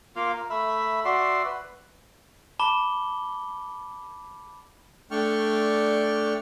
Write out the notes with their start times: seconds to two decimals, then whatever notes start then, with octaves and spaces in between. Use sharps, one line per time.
0.16 A#3 F4 F5
0.34 A#4
0.50 A3 E5 B5
1.05 F#4 D5 E5 C6
1.45 B4
2.59 A5 B5 D6 G7
5.11 A3 D4 D5 G5 C#6 F6